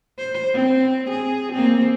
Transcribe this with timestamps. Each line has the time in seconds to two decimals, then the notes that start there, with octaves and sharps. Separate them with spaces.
0.18 C5
0.53 C4
1.09 G#4
1.52 A#3 C4